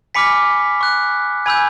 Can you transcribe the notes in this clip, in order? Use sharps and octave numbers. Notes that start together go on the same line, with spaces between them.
G#5 B5 D6 F6 B6 C#7
C#6 F#6
G#5 B5 E6 G6 G#6